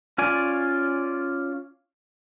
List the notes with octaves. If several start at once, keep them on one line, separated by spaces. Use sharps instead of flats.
C#4 F4 C#5 D5 G#5